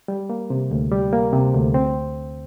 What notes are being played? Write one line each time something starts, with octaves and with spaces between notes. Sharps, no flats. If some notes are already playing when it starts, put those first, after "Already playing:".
G3
A#3
C3
D2
G3
A#3
C3
D2
C4